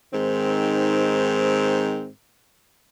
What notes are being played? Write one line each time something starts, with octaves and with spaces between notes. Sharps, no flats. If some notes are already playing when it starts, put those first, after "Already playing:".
G#2 D#3 C4